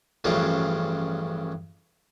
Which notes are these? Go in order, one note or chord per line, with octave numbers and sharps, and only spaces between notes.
A1 G2 C#3 F3 D4 F4